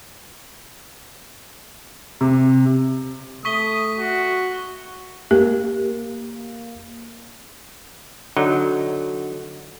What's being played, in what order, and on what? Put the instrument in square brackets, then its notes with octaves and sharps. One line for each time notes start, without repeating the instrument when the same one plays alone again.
[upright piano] C3
[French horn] A3 [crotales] C#6 B6 G7 [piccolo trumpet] D#6
[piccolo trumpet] F#4
[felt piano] A#3 [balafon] G4
[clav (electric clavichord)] D3 F#3 D#4